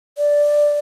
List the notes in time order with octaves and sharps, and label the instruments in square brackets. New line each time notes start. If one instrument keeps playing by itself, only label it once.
[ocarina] D5